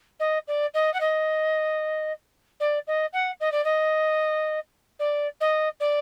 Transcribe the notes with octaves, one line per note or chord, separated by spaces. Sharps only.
D#5
D5
D#5
F#5
D#5
D5
D#5
F#5
D#5
D5
D#5
D5
D#5
D5